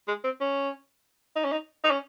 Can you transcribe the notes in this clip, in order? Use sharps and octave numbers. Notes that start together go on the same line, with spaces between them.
G#3
C4
C#4
D#4
C#4
D#4
D#4
C#4